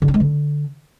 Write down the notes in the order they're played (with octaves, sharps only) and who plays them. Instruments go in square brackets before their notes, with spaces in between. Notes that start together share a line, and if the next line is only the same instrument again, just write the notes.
[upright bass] D3
C4
G#3
D3